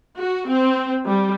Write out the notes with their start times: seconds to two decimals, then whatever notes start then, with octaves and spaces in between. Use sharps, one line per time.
0.17 F#4
0.48 C4
1.06 G3